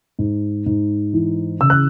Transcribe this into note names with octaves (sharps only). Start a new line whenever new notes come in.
G#2
G#2
E3
C#3 E6
F#6